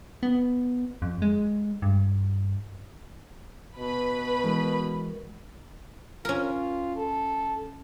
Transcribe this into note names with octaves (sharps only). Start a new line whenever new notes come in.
B3
F2
G#3
G2
B2 B4 B5
E3 G#3 A#4
C#4 F4 A#4
A4